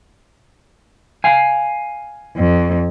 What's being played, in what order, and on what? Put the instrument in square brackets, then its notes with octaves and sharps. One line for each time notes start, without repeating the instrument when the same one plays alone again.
[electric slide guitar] F5 G#5
[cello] F2